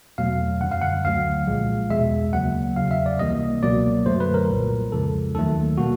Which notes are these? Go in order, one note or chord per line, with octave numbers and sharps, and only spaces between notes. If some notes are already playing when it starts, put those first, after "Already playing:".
E2 B2 F#3 A3 F5
F#2 D3 G3 F#5
F5
F#5
D2 D3 F#3 A3 F5
C2 A#2 F3 G#3
E2 B2 G#3 E5
D2 C#3 F#3 A#3 F#5
E2 C#3 F#3 F5
E5
D5
C#2 C3 E3 G3 A#3 D#5
C#2 B2 F#3 A#3 D5
F#2 D3 F#3 A3 C5
B4
A#4
C2 A#2 G3
F2 C#3 F3 G#3 A4
D#2 D#3 F#3 A3 A4
B2 G3 A#3 F#4